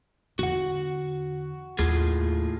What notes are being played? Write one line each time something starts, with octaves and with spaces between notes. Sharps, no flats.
E2 D3 F#4 F#5
D#2 A2 F4 G#4